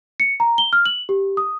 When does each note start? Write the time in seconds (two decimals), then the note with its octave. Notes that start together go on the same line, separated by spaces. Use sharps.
0.20 C#7
0.40 A#5
0.58 G7
0.73 F6
0.86 F#7
1.09 G4
1.37 D#6